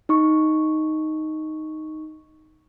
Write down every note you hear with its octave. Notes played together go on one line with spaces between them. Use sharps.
D#4 C#6